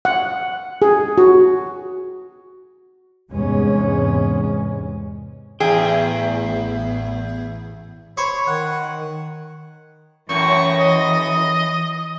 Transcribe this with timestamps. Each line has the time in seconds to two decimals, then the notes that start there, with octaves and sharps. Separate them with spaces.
0.05 F#5
0.82 G#4
1.18 F#4
3.32 E2 G#2 C3 G#3 C#4
5.60 A1 E2 B3 G#4 G5
8.17 C5 C#5 B5 C#6
8.47 D#3 F#5 F#6
10.29 F#2 A2 E3 C#6 A#6
10.79 D#5